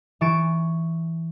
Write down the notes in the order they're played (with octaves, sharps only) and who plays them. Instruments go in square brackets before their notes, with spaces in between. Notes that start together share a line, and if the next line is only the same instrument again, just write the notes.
[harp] E3 C#6 A6 D7 E7